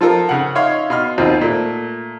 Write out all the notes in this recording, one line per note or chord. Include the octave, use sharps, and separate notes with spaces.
F3 F4 A4 A#4
C#3 F#5
D#4 C#5 E5 F5 C6
B2 C6 F6
D#2 B2 C4 F4
A#2 A3